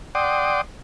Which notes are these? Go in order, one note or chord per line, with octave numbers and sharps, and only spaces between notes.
D5 F#5 G5 C6 D6 D#6